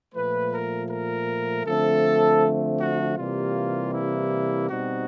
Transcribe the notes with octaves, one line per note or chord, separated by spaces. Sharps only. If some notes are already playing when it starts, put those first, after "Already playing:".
A#2 F3 A3 B4
A#4
A#4
D3 F3 A3 C4 A4
F#4
C3 E3 G3 A#3 F4
E4
B2 G3 C4 D#4 F#4